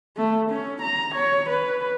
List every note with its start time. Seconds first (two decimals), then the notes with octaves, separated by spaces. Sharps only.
0.17 A3
0.50 C#4
0.82 A#5
1.15 C#5
1.50 B4